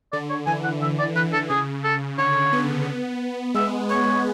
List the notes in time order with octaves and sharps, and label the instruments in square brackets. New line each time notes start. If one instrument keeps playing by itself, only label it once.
[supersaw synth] D3 [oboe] D5
[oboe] C#5
[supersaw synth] E3 [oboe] G#5
[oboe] F#5
[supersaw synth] D3 [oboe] E5
[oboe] D5
[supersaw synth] E3 [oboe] B4
[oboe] A4
[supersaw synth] C#3 [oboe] G#4
[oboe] A4
[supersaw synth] D3 [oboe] C#5
[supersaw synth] B3
[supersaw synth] G#3 [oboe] E5
[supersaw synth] B3 [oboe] C#5